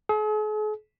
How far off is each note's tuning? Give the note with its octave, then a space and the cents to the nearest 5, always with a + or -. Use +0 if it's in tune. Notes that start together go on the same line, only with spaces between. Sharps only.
G#4 +45